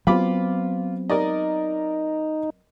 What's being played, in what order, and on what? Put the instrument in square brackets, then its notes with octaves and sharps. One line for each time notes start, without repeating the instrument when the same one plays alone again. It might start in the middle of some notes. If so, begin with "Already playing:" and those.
[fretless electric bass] F#3 B3 C4 [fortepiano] F4 B5 D6
[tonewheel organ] D#4 [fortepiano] A#4 D5 D#5